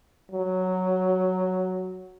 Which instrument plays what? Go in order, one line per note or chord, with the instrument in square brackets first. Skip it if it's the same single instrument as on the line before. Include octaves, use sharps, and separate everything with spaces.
[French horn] F#3